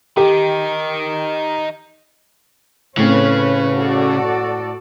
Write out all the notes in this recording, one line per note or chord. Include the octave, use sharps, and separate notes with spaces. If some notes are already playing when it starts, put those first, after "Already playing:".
D#3 D#4 G4
A2 C#3 C4 C#4 B4
F#4 A4 D5